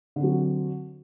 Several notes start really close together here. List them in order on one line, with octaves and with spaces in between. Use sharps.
D3 C4 F#3